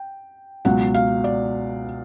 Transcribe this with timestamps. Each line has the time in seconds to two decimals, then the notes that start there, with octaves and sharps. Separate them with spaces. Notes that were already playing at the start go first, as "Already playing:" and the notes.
Already playing: G5
0.65 C#2 B2 F#3 F#5
0.94 F5
1.24 D5